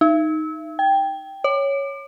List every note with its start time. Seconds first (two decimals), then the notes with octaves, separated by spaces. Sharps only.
0.01 D#4
0.79 G5
1.44 C#5